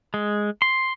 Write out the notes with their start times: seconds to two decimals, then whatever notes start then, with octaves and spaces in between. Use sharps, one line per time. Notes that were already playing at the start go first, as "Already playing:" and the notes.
0.14 G#3
0.62 C6